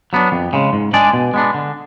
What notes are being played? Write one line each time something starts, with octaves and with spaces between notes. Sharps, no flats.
F#3 B3 D4
F2
C#3 G#3
G#2
G#3 D4 G#4 D5
B2
G#3 B3 D4
D3